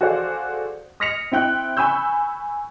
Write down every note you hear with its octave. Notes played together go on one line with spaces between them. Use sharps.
F#4 G#4 A4 C5 D5 F5
D#6 F6 A#6 B6 C#7 F7
C4 E4 G5 F#6
G#5 B5 C#6 E6 G6